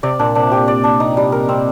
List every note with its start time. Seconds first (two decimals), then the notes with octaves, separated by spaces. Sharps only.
0.03 C3 D5
0.19 A#2 D4
0.35 C3 D4
0.51 A#2 G4
0.68 D5
0.84 D4
1.00 D#4
1.17 G3
1.32 A#4
1.49 C4